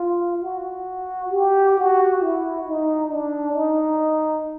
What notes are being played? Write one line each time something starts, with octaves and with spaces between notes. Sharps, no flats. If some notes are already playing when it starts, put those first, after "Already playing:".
Already playing: F4
F#4
G4
F#4
E4
D#4
D4
D#4